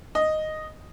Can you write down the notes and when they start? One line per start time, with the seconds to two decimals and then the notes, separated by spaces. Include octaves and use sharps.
0.15 D#5